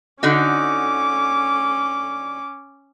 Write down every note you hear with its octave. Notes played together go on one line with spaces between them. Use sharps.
D3 C#4 D#4 F#4 D6